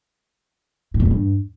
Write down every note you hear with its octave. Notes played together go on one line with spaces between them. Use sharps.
A2
E2
A2
G2